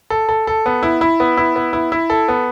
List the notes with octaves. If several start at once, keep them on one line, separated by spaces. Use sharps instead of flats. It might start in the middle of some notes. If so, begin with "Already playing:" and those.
A4
A4
A4
B3
E4
E4
B3
E4
B3
E4
E4
A4
B3